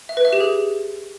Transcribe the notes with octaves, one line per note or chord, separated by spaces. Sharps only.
E5
B4
E5
G4
G#4